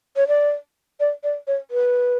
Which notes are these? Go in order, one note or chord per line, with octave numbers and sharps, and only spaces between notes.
C#5
D5
D5
D5
C#5
B4